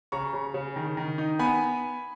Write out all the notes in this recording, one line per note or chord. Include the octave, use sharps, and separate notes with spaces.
C#3 A#5 C#6
C#3
C#3
D#3
D#3
D#4
B3 G#5 B5